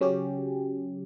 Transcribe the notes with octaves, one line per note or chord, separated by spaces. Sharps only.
C#3 F#3 C#4 G4